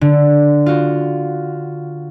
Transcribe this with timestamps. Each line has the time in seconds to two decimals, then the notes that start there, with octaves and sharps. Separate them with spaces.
0.01 D3
0.66 F4 F#4